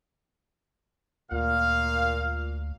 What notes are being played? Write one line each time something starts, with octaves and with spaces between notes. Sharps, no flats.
D2 A#2 F5